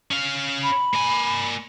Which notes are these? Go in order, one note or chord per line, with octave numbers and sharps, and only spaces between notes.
C#4 F5
B5
A#3 G#5